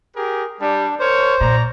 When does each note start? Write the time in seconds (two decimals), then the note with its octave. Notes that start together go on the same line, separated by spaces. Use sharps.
0.16 G4 G#4 A#4
0.61 G3 D4
1.00 A#4 C5 C#5
1.41 A#2 D5 A#5